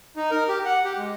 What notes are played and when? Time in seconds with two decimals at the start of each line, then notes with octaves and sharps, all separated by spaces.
0.16 D#4
0.31 A#4
0.48 G4
0.65 F#5
0.85 G4
0.98 G#3